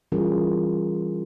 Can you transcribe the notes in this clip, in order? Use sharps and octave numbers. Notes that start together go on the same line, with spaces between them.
E3 G3 C#4 F4 G#4 A#4